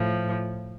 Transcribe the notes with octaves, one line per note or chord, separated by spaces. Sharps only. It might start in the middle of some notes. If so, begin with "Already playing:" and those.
Already playing: A2 F3